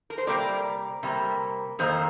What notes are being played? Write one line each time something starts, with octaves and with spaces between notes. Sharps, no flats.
A#4
C5
C3 G3 A#3 A#4 D5
C3 G3 A#3
F2 D#3 A#3 A4 C5